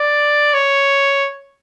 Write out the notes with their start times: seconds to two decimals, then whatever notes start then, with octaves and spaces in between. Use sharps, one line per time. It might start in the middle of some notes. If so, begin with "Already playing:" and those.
Already playing: D5
0.54 C#5